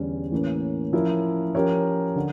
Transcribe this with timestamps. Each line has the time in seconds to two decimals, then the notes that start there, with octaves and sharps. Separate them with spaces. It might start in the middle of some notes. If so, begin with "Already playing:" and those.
Already playing: E2 D3 G3 C#4 G4
0.32 A2 E3 A#3 C#4
0.93 F3 C#4 E4 A#4
1.55 F3 C#4 G4 A#4 C#5
2.16 D3